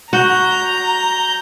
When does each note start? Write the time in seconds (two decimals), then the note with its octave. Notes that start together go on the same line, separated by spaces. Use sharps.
0.13 F#4 A#5 G6